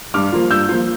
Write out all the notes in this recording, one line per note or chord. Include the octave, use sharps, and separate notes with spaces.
G2 D6 F6
F3 A#3 F4
G2 E6 G6
F3 A#3 F4